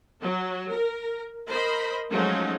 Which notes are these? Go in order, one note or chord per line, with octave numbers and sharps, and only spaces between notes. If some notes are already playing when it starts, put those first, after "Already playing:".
F#3
A#4
A#4 C5 D#5 B5
F3 F#3 G#3 A3 C#4 D#4